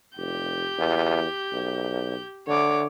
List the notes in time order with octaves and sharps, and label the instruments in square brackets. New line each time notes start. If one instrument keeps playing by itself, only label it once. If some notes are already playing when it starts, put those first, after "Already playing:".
[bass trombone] F1 [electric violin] G4 G6
[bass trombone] E2
B1
[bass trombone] D3 [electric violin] C#5 D6